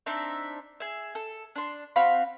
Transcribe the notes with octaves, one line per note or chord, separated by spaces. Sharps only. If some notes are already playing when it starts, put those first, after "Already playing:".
C4 D4 D#4 E5
G#4 E5
A4
D4 C6
C4 F#4 F5 B5